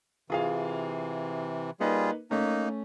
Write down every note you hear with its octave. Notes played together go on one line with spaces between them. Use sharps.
C3 E3 F4 G#4 F5
G3 A#3 D#4 F4 G#4 B4
A3 A#3 C#4 D#4